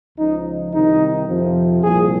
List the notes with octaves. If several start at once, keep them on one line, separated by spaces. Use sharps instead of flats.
C#2 C#3 F3 D#4
C2 C3 D#3 D#4
F2 C3 F3
C2 A#2 F3 G#4